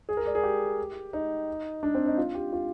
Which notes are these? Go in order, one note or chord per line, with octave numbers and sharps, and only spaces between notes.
G#4
A#4
D5
G#4
G4
D#4
D4
C4
D#4
F4
G4
F4